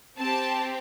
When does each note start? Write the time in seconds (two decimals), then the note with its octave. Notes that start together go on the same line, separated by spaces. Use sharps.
0.17 C4 G4 A5